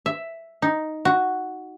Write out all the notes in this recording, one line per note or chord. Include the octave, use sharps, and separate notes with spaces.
E5
D#4
F#4